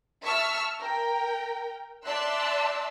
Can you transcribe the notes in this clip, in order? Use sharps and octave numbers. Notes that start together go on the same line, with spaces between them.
E5 A5 C#6 E6 F6
A#4 G5
D5 E5 A5 C6 E6 F#6